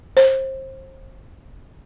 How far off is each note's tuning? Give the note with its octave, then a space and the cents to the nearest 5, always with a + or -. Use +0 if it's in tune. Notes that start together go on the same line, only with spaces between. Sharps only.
C5 +25